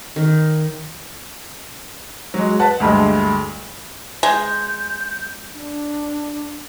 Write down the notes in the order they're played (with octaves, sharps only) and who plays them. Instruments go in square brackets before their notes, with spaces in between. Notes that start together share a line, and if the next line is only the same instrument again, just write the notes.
[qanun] D#3
[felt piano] F#3 G#3
B4 F#5 A5
D2 G2 G#3
[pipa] G#3 [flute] G6
[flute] D4